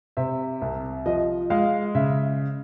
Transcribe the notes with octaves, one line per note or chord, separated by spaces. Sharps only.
C3 E5
C2
F3 D#5
G#3 F5
C#3 E5